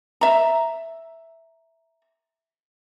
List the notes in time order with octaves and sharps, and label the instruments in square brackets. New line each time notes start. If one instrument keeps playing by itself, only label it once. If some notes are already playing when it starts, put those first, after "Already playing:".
[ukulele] E5 A#5